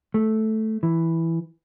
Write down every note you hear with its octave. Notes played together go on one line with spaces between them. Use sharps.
A3
E3